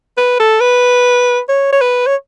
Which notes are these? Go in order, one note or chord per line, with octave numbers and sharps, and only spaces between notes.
B4
A4
B4
C#5
C#5
B4
C#5